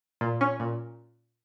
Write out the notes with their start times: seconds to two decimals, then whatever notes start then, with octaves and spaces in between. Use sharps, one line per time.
0.21 A#2
0.41 C#4
0.60 A#2